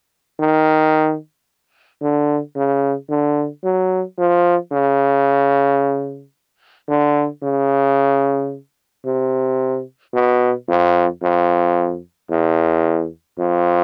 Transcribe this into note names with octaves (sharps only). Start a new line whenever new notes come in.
D#3
D3
C#3
D3
F#3
F3
C#3
D3
C#3
C3
B2
F2
F2
E2
F2